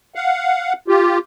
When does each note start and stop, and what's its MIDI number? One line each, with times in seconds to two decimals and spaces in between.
0.15 0.73 77
0.15 0.73 78
0.88 1.18 65
0.88 1.18 67